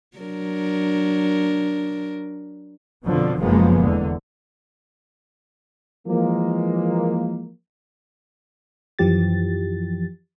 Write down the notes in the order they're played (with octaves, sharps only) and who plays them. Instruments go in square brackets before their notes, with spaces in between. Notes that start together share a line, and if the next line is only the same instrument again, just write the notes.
[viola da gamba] F#3 D4 A#4
[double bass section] F2 B2 D3 F3
F1 F#2 F3 G#3 A#3 B3
E2 D3
[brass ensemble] E3 F3 G#3 A#3
[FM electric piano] F#2 E3 F3 G4 A6